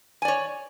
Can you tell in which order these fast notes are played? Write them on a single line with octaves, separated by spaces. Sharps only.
G#5 D5 C#5